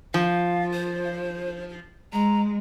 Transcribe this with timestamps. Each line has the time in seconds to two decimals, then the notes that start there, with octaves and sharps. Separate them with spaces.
0.14 F3 F5
0.73 C5
2.13 G#3 A#5